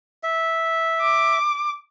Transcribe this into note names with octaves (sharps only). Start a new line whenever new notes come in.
E5
D6